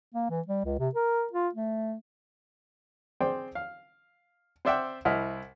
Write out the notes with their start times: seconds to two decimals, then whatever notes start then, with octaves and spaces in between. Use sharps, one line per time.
0.14 A#3
0.30 E3
0.47 G3
0.65 C#2
0.79 C3
0.95 A#4
1.33 F4
1.54 A3
3.20 C4 G#4 C5 D5 G5
3.55 F5
4.65 C4 C5 D5 E5 F#5 G5
5.05 C2 E4 D#5 F#5 F6